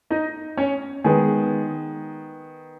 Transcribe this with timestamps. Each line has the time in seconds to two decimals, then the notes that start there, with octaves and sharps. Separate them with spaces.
0.10 D#4 D#5
0.57 C#4 C#5
1.04 D#3 G#3 B3 G#4